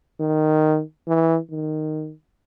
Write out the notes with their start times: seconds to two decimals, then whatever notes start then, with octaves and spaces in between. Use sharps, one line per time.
0.20 D#3
1.08 E3
1.51 D#3